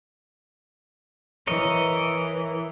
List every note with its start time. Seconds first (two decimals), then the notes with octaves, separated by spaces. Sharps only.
1.47 E3 A#4 C#5 D#5